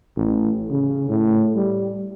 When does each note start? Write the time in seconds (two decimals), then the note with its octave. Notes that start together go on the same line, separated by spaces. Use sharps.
0.16 A1
0.71 C#3
1.09 A2
1.56 G3